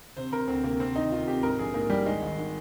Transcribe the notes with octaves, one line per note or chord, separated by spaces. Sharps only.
C3 C5
C3 A#4
D2 C4
C3 A#3
C3 C4
D#3 D#4
D#3 F4
C3 G4
G#2 A#4
A#1 G#4
G#2 A#3
A#1 G3
D#3 G#3
G#1
D#3